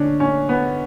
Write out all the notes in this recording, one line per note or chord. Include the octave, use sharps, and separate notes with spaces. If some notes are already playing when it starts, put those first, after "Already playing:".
Already playing: D3 C#4 D4
C#4
B3